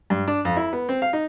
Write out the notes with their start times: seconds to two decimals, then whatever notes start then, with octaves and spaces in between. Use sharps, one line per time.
0.10 G2
0.28 D4
0.45 F2
0.57 E4
0.73 B3
0.89 C4
1.02 F5
1.13 D#4